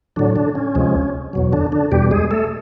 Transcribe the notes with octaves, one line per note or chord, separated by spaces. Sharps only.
A2 D3 F#3 D4
D3 D4
C#4
D2 C3 F3 G#3
E2 B2 F#3
D3 D4
D3 D4
E2 B2 G3 G4
G#3 G#4
A3 A4